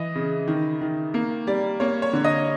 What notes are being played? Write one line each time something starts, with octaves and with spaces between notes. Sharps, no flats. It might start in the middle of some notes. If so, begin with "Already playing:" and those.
Already playing: E3 D#5
C#3
D#3
D#3
A#3
G3 D5
A#3 C#5
C#5
D3
D#5